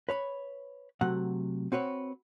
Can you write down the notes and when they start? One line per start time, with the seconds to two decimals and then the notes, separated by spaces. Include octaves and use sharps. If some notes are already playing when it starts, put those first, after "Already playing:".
0.09 B4 C#5 B5
1.01 C3 F#3 A3 F#5
1.72 C4 F#4 B4 C#5